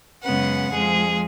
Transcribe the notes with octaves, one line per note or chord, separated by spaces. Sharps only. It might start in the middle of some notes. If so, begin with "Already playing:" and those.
F#2 C#3 G#3 B3 F#5
F2 F3 G#3 G#4